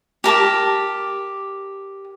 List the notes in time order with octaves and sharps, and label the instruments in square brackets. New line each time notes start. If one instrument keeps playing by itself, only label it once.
[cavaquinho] G4 A#4 A5 D6